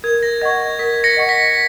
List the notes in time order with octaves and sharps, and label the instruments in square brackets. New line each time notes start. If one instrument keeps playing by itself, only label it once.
[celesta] A#4 [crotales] G#6
[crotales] A#6
[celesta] D#5 F#5 C#6 [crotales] G#6
[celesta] A#4 [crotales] B6
[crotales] A#6 C#7
[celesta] D#5 F#5 C#6
[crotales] B6